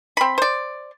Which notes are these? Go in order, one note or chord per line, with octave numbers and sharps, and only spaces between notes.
C4 B5
C5 D5